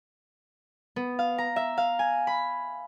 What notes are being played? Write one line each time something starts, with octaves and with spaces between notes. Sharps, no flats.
B3
F5
A#5
E5
F5
G#5
B5